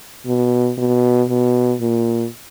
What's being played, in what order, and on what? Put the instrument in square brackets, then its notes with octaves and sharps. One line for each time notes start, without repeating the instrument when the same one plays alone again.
[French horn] B2
B2
B2
A#2